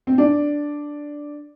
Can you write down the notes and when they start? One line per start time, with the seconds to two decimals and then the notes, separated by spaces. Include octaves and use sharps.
0.07 C4
0.18 D4